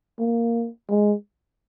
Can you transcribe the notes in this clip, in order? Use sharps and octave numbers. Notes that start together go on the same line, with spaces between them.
A#3
G#3